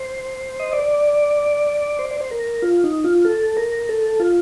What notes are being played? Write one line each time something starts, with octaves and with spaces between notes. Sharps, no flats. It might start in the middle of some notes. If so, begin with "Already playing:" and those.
Already playing: C5
D#5
D5
C5
D5
C5
A#4
F4
D#4
F4
A4
A#4
A4
F4